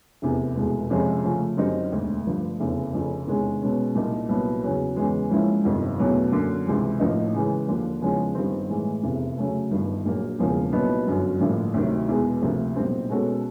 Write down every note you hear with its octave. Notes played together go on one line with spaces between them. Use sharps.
F1 E2 C3
F1 E2 B2 G#3
F2 C3 F3 G#3 C#4
C#3 F3 A3 C#4 F4
F#2 D3 G3 C4 D#4
E1 D2 D3
G2 D3 F3 A3
F1 E2 C#3
F1 F2 C#3
E2 C3 D#3 G#3 C#4
B2 G#3 C#4
C2 A#2 G3 A#3 D#4
C2 A#2 F#3 B3
E2 C#3 F#3
E2 C#3 E3 G#3
G#2 F3 A#3 C#4 E4
G1 F2 C3 D#3
E2 B2 F#3 A3 C#4
F#2 D3 F#3 A#3
C#2 C3 E3 G3
A1 A2 F3 A#3 D#4
C#3 E3 G#3
D#2 D3 F3 A#3 D4
E2 C#3 F3 G#3 C#4
G1 G2 D#3 G3 C4
A2 E3 G#3
F1 E2 C3
C#3 F#3 A3
G1 G2 D#3
A#1 A#2 F#3 A#3
E1 E2 C#3 F3 A#3
C2 A#2 F#3 B3 D#4
G1 F#2 D3 F#3
A1 G2 D3 F3 A#3
D2 C3 D#3 F#3
E2 B2 G#3
D2 C3 F3 A#3
B1 A#2 G3 C4
B2 G#3 C#4 F#4 A4